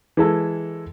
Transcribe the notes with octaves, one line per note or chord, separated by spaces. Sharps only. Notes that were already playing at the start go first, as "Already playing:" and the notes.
E3 G#3 A4